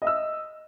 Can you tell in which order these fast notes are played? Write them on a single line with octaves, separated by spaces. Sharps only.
D#5 E5 E6